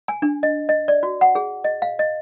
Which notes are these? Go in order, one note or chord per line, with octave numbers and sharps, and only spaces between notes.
G#5
D4
D#5
D#5
D5
F#4
F#5
G#4
D#5
F5
D#5